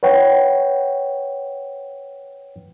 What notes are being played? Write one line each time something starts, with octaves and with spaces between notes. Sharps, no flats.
B4 C#5 F#5 G5